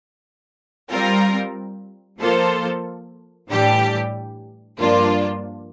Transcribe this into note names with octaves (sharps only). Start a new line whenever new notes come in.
G3 C4 F4 A#4
F3 A#3 F4 A4 C5
A2 E3 G3 D4 G4
G2 F3 A#3 D4 F4